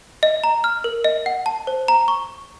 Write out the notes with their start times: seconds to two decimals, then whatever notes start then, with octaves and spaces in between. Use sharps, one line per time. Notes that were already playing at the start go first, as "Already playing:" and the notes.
0.23 D#5
0.44 A#5
0.64 F6
0.84 A#4
1.04 D#5
1.26 F#5
1.46 A5
1.67 C5
1.88 A#5
2.08 C#6